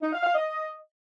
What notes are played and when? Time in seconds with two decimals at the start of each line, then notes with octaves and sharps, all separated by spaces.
0.02 D#4
0.12 F5
0.23 F5
0.34 D#5